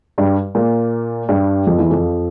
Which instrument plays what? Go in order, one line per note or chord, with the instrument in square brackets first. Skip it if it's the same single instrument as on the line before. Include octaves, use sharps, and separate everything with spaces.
[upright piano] G2 G3
A#2 A#3
G2 G3
F2 F3
E2 E3
F2 F3